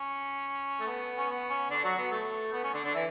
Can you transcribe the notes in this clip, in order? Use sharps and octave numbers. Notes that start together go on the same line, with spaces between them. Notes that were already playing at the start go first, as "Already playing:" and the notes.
Already playing: C#4
A3
B3
C#4
B3
C#4
D3 D4
F#3 F#4
B3
A3
B3
C#4
D3 D4
D3 D4
E3 E4